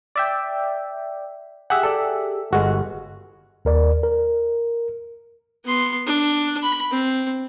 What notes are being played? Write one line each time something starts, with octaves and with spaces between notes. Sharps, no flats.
D5 E5 G5
G4 G#4 E5 F#5
A4 D5
G1 G#3 F#4
D#2 A#4 D5
A#4
B3 C6
D4
B5
C4